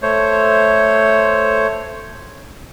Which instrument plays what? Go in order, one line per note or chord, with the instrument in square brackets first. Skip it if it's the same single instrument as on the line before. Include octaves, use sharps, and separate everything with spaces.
[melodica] A3 C5 C#5